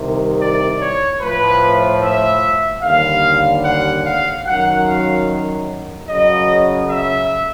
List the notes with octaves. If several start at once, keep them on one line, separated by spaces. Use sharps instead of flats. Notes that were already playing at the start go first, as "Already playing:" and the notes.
Already playing: C2 C3 D#3
D5
C#5
A2 F3 B4
E5
D#2 D3 G3 F5
F#5
F5
F#2 D#3 F#3 F#5
F5
F#2 C#3 F#3 D#5
E5